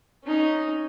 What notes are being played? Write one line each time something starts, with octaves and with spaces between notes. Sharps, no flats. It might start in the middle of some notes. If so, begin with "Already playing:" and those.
C#4 D#4